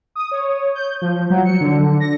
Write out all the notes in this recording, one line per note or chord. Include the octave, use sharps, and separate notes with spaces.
D#6
C#5
G6
F3
F#3
C#7
D3
A#6